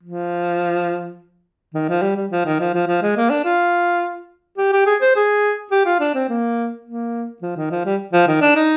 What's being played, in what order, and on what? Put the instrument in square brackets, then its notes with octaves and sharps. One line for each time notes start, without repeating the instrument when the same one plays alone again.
[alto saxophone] F3
D#3
F3
G3
G3
F3
D#3
F3
F3
F3
G#3
A#3
D4
F4
G4
G4
G#4
C5
G#4
G4
F4
D4
C4
A#3
A#3
F3
D#3
F3
G3
F3
D#3
D4
D#4